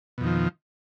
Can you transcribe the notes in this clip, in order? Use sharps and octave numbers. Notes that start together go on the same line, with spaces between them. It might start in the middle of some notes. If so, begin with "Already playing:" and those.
F2 B2 D#3 F3